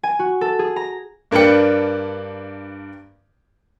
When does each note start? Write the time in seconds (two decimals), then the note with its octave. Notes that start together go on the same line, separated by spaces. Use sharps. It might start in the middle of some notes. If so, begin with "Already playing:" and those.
0.03 G#5
0.19 F#4
0.41 A4
0.59 G#4
0.76 A#5
1.31 G2 A#3 D4 B4 G5 C#7